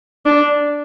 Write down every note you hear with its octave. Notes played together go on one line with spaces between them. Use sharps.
D4